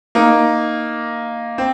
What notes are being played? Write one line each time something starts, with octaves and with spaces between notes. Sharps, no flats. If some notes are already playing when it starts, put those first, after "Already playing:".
A#3 D#4
C4